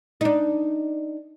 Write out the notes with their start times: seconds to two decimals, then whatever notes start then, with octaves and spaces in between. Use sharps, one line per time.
0.21 D4 D#4